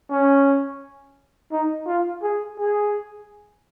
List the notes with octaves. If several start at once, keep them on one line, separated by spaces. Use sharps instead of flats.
C#4
D#4
F4
G#4
G#4